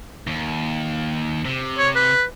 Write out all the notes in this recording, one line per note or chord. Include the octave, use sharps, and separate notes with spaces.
D#2
C3
C#5
B4